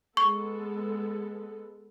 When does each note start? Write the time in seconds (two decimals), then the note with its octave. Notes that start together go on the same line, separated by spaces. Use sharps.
0.17 G#3 B3 A4 C#6